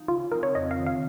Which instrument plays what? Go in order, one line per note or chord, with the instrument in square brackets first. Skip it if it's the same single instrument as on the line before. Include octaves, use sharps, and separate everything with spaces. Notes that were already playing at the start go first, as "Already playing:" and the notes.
Already playing: [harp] F3 D#4
[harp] C#3 [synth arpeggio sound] F4
[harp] F3 C4 D#4 [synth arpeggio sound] A#4
[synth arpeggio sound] C#5
[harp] F2 [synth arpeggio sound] D#5
[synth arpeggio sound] F5
[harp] C3 D#3
[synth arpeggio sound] F5